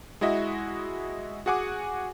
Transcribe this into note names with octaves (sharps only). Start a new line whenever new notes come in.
G#3 E4 F#4 D#5 E5
F#4 G#4 F#5 G#5 D6